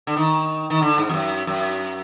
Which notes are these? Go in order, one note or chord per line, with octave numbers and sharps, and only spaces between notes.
D3
D#3
D#3
D3
G#2
F2
F#2
F#2